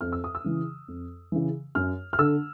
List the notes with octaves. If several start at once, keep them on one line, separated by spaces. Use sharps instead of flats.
F2 F6
E6
D#6
E6
C#3 E3
F2
C#3 E3
F#2 F6
F6
D3 E6